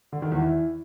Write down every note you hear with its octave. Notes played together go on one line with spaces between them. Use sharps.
D3
D#3
E2
E3